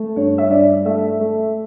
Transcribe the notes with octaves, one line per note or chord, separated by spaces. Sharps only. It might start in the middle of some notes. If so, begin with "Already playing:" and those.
Already playing: A3
G2 C#5
E5
G2 D5
A3 E5
A3